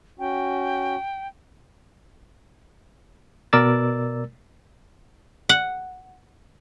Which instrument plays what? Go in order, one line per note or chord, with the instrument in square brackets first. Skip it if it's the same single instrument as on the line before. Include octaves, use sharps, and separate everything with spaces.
[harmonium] C#4 F#4 [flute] G5
[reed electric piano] B2 A#4 D5 E6 A6
[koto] F#5